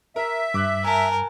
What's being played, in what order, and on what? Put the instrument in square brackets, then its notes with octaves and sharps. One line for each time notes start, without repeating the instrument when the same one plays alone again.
[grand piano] A#4 [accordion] E5
[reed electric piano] G2 [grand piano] D6 F#6
[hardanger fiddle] A#4 [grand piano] G#5 A5